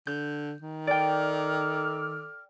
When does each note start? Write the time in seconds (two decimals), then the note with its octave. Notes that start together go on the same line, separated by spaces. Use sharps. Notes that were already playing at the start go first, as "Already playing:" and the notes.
0.07 D3 G6
0.62 D#3
0.87 A4 D5 G5 D6 F6